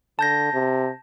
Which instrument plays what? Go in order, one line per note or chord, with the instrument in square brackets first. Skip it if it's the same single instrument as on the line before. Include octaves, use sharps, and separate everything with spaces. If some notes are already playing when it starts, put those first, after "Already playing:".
[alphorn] D3 [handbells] A5 G6 A#6
[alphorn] C3